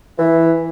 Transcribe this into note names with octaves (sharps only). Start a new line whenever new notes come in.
E3